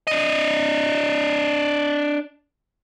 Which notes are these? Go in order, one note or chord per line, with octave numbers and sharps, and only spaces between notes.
D4 D#5